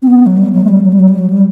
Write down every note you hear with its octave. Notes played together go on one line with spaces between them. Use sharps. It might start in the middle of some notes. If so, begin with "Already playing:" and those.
C4
B3
F#3
G3
F#3
A3
G3
F#3
G3
F#3
G3
F#3
G3